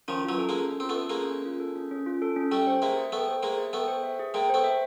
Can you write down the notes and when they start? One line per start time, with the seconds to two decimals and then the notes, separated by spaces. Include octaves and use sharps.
0.08 D#3 F3 C#4
0.24 E3 F#3 F4
0.38 A4
0.49 G#3 A#3
0.55 C#4
0.70 C#4
0.80 C4 F4
0.89 A3 B3
0.99 A4
1.10 G#3 A#3
1.15 C#4
1.30 C#4
1.45 F4
1.60 A4
1.76 C#4
1.91 C#4
2.06 F4
2.22 A4
2.36 C#4
2.51 G3 A3 G5
2.67 C5
2.82 G#3 A#3 E5
2.97 G#4
3.12 A3 B3 G5
3.28 C5
3.43 G#3 A#3 E5
3.58 G#4
3.73 A3 B3 G5
3.88 C5
4.03 E5
4.19 G#4
4.34 G#3 A#3 G5
4.50 A3 B3 C5
4.64 E5